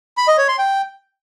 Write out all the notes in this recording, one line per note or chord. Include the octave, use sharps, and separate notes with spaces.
B5
D#5
C#5
C6
G5